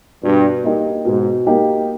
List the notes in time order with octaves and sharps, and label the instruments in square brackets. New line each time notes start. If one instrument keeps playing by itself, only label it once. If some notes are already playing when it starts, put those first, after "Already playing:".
[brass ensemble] G2 [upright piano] B2
[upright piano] A#3 D#4 G4
[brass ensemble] G#2 [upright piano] B2
[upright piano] A#3 D#4 G4